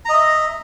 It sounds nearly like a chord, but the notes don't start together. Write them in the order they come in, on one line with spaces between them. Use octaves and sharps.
A#5 D#5 E5